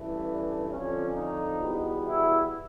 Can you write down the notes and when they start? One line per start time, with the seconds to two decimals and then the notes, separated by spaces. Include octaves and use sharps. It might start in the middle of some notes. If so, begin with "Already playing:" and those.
Already playing: A1 G2 E3 A3
0.25 D4
0.70 F2 D3 F3 C#4
1.15 D#4
1.61 E2 B2 G3 B3
2.06 E4